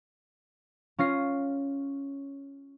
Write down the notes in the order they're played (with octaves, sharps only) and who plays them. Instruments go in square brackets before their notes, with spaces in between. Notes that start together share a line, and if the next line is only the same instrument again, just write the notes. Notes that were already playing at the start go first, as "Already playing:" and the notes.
[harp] C#4 F4 A#6 C7